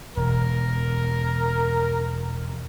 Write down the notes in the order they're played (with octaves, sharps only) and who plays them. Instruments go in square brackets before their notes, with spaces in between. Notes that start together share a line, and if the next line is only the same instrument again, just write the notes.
[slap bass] E1 [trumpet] A#4